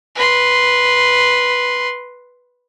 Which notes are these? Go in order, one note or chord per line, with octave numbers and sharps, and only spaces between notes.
B4 C6